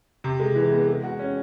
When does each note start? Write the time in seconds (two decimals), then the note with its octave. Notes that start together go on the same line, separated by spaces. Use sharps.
0.24 C3
0.40 G#3
0.55 E3
0.72 B3
0.87 G#3
1.03 F#4
1.19 C#4